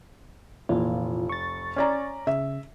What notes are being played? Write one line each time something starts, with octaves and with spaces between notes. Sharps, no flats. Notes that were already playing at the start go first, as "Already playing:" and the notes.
F1 A#2 E3 F4
C#6 A6
C#4 D5 A#5
C#3 E5